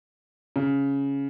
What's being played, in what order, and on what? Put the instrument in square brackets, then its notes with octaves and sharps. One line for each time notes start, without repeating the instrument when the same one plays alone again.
[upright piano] C#3